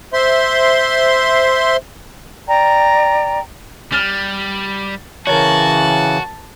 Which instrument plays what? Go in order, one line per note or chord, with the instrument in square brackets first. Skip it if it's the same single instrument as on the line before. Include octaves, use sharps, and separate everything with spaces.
[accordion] C5 E5 C6
[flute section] D5 G5 A#5
[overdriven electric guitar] G3 [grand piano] F6 A6 G7
[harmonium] C#3 E3 [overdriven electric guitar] F#4 [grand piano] A#4 C#5 [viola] A5